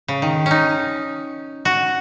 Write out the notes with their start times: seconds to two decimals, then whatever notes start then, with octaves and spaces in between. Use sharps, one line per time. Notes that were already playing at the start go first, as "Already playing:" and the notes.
0.08 C#3
0.22 D#3
0.46 C#4 D#4
1.65 F#4